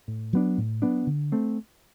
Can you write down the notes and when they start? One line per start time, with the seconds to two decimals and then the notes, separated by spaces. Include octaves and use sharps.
0.08 A2
0.33 F#3 B3 D4
0.58 A2
0.82 F#3 B3 D4
1.07 D3
1.32 A3 C4